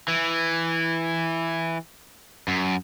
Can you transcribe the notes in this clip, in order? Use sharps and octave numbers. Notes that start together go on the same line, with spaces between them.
E3
F#2